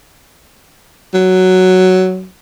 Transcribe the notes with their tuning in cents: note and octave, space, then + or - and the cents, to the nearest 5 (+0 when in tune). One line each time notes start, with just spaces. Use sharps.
F#3 +5